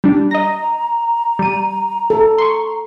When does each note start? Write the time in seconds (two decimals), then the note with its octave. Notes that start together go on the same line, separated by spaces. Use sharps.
0.04 G3 D4
0.31 D#5 A#5 A#6
1.39 G3 D#7
2.10 A4
2.38 C6 C#6